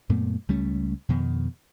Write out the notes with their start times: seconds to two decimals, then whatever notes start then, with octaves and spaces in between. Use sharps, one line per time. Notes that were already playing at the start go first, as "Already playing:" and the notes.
0.09 F#2 A#2 A3 B3
0.49 C#2 G3 A3 C#4
1.09 F2 B2 D#3